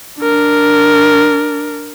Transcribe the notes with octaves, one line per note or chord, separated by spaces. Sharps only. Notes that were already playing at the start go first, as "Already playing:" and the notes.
D4 A#4